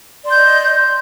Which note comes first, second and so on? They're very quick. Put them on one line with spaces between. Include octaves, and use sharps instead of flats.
D5 C6 G6 D#5